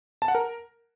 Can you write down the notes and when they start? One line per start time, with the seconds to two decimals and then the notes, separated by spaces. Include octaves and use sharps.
0.22 A5
0.28 F#5
0.35 A#4